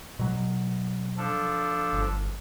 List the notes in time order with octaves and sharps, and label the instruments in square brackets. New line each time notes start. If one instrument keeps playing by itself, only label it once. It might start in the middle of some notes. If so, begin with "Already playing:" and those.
[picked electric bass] B2 F#3
[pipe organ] F3 D4 A4
[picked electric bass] G1